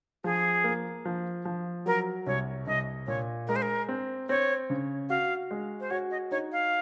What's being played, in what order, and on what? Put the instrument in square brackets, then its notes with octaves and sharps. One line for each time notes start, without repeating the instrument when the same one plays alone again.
[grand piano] F3 [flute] G#4
[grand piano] A#3
F3
F3
[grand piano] F#3 [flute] A#4
[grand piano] C2 [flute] C#5
[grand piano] C2 [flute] D#5
[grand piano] A#2 [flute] C#5
[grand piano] G#3 [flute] A#4
[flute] C5
A#4
[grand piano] C4
[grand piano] C4 [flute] C#5
[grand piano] C#3
[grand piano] F#4 [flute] F5
[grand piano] G#3
[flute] C5
[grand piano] F#4 [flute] C#5
[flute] D#5
[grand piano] D#4 [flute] C#5
[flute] F5